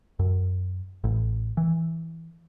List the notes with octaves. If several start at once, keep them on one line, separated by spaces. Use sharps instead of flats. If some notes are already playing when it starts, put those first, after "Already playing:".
F#2
A1
E3